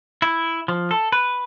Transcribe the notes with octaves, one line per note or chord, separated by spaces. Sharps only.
E4
F3
A4
B4